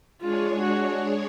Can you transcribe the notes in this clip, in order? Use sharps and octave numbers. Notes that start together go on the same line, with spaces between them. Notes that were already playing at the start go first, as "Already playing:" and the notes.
G#3 D4 F4 G#4 C#5
F#4